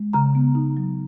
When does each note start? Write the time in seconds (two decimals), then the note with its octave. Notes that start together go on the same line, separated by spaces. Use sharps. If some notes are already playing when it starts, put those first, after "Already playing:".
Already playing: G#3
0.13 C#3 A#5
0.35 B3
0.55 D#4
0.77 F#3